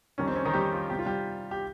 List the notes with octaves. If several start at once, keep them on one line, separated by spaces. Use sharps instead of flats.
F2 D#3 G3 C#4
C4
C#4
D#3 D#4
G3 G4
F3 F4
C3 G3 G4
F4
G3 G4
G4